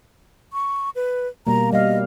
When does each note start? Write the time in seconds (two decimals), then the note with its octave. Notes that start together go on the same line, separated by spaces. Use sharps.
0.53 C#6
0.96 B4
1.47 B2 G3 A#3 A#5
1.73 G3 D#5 F5